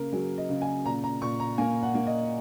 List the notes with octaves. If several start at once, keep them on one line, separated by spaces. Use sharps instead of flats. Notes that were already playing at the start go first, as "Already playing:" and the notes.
Already playing: C#3 A#3 A#4
F#3 G#4
D#5
C#3
G#5
A#2 A#5
A#5
A#2 C#6
A#5
A#3 G#5
F#5
A#3
D#5